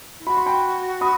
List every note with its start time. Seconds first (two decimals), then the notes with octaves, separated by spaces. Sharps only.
0.20 E4
0.27 F#4 B5
0.37 C6
0.46 G5 B5
1.01 B5 D#6